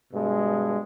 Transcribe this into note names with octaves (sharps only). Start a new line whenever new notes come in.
G2 B2 G#3